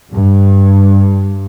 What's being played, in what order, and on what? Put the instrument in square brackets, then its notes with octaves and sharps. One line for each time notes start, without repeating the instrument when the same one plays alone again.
[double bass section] G2